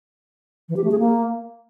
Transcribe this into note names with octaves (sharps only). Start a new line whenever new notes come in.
E3
G4
A3
G#4
A#3